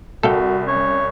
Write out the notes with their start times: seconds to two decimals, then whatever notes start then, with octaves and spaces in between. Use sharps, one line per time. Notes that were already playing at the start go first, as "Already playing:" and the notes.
0.23 C2 F#4 A4 F5 G5
0.67 C#4 C#5